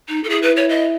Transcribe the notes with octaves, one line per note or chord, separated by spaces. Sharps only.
D#4
A4
E4 G#4
B4
C#5
D#5